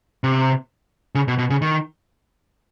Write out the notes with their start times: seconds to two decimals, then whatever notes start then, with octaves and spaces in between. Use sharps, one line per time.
0.24 C3
1.15 C#3
1.28 B2
1.38 B2
1.50 C#3
1.62 D#3